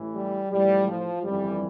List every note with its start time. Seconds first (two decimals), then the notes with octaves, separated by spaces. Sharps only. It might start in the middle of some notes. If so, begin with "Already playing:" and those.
Already playing: A1 A2 E3
0.14 G3
0.50 A1 A2 F3 G3
0.86 F3
1.23 G1 F2 E3 G3